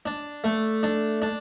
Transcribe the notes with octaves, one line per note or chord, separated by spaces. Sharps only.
D4
A3
D4
D4